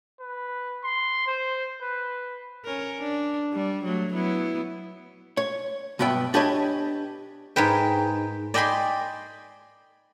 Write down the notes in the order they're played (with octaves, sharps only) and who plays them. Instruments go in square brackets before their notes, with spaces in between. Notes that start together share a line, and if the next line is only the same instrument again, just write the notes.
[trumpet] B4
C6
C5
B4
[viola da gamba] C#4 A#4
D4
G3
F#3 A3
F#3 B3 E4
[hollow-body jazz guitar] C#5
B1 G2 B3 B4 E5 G5
D4 G4 B4 C#5 D#5 G#5
[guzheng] G#2 A#4 B4 G5
D5 D#5 G5 G#5 B5 C6